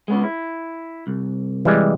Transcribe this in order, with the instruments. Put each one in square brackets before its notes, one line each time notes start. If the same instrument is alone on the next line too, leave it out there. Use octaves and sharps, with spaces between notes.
[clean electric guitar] G#3 B3 C#4
E4
C2
[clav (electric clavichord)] E3 G3 G#3